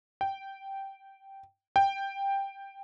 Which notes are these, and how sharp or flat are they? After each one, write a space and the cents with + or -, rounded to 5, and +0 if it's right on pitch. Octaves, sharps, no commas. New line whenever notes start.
G5 -10
G5 +5